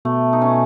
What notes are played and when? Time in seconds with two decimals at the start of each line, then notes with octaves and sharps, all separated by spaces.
0.05 B2 A3
0.33 D#4
0.42 C#4